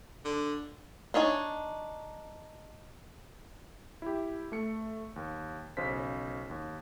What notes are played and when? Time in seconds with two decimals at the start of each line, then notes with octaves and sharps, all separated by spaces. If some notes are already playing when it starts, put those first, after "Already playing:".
0.25 D3
1.14 D4 D#4 C#5 G#5
4.02 E4 G4
4.52 A3 C#7
5.16 D#2
5.77 B1 C#3 C5 B6
6.50 D#2